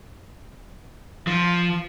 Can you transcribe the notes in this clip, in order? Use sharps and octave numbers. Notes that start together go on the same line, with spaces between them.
F3